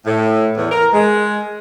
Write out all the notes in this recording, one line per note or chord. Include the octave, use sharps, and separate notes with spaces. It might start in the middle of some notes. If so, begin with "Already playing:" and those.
A2
E2
A#4
G#3